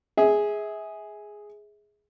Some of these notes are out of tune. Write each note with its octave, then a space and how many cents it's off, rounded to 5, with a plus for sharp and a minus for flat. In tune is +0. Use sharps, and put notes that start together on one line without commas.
G#4 +0 E5 -30